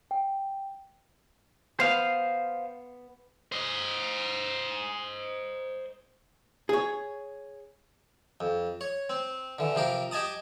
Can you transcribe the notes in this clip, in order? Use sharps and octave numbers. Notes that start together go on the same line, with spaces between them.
G5
B3 C5 F5
C5 D#5
G#4 C#5
F2
C#5
C4
D3 E3
C3 F3 G4 A#4
G4 D#5 G#5 A5 D#6